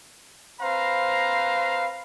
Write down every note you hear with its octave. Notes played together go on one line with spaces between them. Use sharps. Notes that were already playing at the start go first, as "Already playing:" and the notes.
C4 B4 C5 F5 A#5